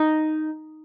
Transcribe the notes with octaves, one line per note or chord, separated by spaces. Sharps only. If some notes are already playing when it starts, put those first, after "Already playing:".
Already playing: D#4